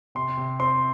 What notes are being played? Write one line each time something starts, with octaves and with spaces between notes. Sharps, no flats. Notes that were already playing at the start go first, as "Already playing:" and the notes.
C3 C6
C3
C4 C6